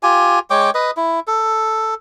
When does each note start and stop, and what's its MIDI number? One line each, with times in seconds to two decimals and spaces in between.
0.03 0.39 65
0.03 0.39 67
0.03 0.39 80
0.50 0.70 56
0.50 0.70 73
0.50 0.70 79
0.50 0.70 86
0.74 0.91 71
0.74 0.91 75
0.97 1.20 64
1.27 1.94 69